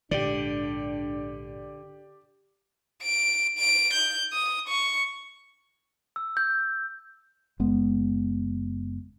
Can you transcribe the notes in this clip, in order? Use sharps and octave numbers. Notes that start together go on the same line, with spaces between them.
A#1 G#2 D3 D4 G4 D5
D7
D7
G6
D#6
C#6
E6
G6
F#1 G#3 B3